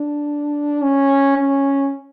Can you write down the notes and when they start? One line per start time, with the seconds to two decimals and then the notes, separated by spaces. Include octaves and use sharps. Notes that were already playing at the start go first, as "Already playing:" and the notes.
Already playing: D4
0.82 C#4
1.37 C#4